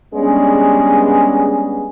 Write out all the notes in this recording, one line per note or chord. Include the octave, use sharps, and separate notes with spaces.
G3 G#3 B3 C#4 D4 G#4